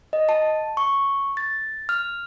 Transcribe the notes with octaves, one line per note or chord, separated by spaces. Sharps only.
D#5
A5
C#6
A6
F6